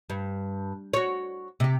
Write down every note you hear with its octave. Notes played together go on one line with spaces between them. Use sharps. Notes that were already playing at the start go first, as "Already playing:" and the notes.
G2
F#4 C#5
C3 G4